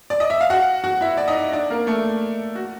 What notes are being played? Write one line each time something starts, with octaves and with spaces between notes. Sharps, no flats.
D5
D#5
E5
F5
F#4 F#5
F#4 F#5
E4 E5
D5
D#4 D#5
D4 D5
A#3 A#4
A3 A4
F#4